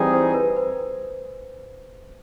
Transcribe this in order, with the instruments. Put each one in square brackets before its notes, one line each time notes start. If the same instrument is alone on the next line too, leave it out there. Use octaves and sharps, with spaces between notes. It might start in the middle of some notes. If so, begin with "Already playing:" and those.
Already playing: [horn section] E3 G3 C4 D#4 G#4
[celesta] C5
B4
C5